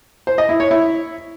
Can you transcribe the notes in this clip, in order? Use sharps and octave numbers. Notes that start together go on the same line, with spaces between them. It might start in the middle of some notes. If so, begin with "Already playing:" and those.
C5
D#5
E4
C#5
E4